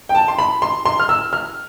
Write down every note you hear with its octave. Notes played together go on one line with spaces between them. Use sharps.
G5
A5
C6
B5
C6
C6
F6
E6
F6